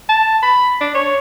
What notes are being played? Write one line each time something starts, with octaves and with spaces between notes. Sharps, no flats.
A5
B5
D4
C#5